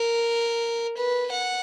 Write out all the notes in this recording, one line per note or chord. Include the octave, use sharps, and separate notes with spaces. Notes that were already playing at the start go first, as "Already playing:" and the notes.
Already playing: A#4
B4
F#5